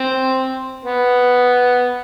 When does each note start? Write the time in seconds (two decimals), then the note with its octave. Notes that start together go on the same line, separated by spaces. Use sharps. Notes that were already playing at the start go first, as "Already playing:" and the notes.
Already playing: C4
0.85 B3